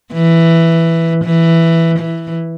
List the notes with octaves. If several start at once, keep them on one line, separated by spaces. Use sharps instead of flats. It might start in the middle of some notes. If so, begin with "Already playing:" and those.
E3
E3
E3